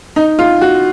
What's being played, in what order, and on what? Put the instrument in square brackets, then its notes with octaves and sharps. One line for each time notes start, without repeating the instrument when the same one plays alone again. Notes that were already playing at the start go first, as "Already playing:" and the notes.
[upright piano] D#4
F4
F#4